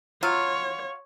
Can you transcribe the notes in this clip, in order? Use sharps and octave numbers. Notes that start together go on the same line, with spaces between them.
F#3 F4 C#5